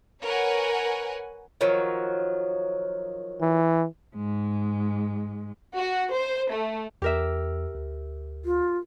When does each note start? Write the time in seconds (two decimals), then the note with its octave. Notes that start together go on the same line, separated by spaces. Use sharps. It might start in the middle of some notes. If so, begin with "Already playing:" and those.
0.23 A#4 B4 C#5 F#5 G#5
1.61 D#3 F3 F#3
3.41 E3
4.15 G#2 G#3
5.77 F#4
6.14 C5
6.52 A3
7.02 E2 G4 A#4 E5
7.75 D2
8.45 F4